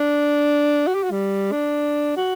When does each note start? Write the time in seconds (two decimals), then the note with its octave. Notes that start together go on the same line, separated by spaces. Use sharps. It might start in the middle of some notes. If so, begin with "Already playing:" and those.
Already playing: D4
0.87 F#4
0.95 G4
1.03 F#4
1.11 G3
1.52 D4
2.17 F#4